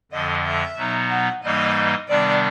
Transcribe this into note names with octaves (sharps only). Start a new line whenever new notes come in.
F2 D3 F3 D#5
E5
B2 F#3 B3 D#4
F#5
G#2 E3 G3 A#3 D#4 D#5
C3 D#3 G3 B3 D4 D5